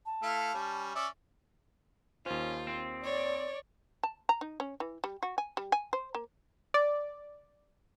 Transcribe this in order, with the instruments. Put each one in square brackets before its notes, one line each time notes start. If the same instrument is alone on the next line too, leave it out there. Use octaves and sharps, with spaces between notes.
[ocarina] A5
[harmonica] A3 E4 F5
G3 C#4
[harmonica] C#4 D5 E5 [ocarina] D6
[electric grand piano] D#2 C5 [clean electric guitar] C#4 [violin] F4
[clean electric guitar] C4
[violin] C#5 [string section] D5
[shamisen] A5
A#5
D#4
C#4
E3
G3
F#4
G#5
G3
G#5
C5
A#3
[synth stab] D5